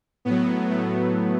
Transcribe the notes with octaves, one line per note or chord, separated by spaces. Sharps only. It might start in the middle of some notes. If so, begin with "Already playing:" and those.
A2 F#3 B3
A3